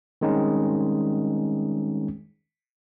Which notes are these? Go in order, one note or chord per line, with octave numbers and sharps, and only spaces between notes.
D#3 G3 G#3 C4 C#4 D#4